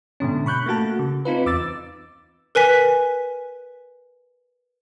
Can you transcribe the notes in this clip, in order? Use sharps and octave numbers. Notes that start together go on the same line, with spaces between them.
G#2 B2 D3 C#4
B5 C#6 F#6 G6
A3 A#3 F#4 A5
C#3
C4 D#4 F4 B4
E2 D6 E6 A6
A#4 B4 G#5 B6